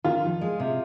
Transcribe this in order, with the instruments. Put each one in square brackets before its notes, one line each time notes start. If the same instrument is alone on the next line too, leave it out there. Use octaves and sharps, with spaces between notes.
[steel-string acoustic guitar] D#3 [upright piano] F4
[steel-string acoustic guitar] F2
G#3
C3